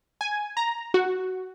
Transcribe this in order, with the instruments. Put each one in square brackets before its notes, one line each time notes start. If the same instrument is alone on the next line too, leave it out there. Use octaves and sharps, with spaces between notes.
[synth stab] G#5
A#5
F#4